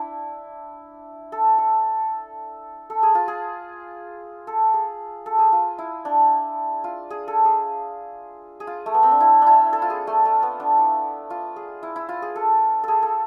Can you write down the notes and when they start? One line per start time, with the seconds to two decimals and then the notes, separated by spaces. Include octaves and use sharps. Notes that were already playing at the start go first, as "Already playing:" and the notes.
Already playing: D4 E4
1.32 A4
1.58 A4
2.90 A4
3.03 G#4
3.15 F4
3.28 G#4
4.47 A4
4.73 G#4
5.26 A4
5.39 G#4
5.52 F4
5.78 E4
6.05 D4
6.84 F4
7.10 G#4
7.28 A4
7.45 G#4
8.60 G#4
8.67 F4
8.86 A3
8.94 B3
9.03 C4
9.11 D4
9.20 E4
9.42 D4 E4
9.73 A4
9.82 F4
9.90 G#4
10.07 A3
10.25 A3
10.43 B3
10.60 D4
10.78 E4
11.30 F4
11.56 G#4
11.83 E4
11.96 E4
12.09 F4
12.22 G#4
12.36 A4
12.83 G#4 A4
13.02 A4